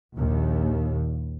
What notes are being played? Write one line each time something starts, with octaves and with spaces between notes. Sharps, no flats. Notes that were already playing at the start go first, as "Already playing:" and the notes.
A#1 D#2